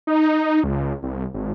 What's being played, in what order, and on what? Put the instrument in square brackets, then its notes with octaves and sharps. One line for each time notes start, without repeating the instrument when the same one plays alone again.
[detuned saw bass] D#4
C#2
C2
G#1